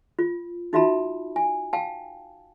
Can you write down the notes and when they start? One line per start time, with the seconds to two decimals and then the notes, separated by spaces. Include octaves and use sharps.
0.19 F4
0.73 D#4 F4 F#4 E5 A5 B5
1.36 G#5
1.73 F5 G5 A5